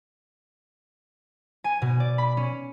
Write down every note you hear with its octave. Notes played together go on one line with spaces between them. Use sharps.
G#5
B2
D5
B5
C#4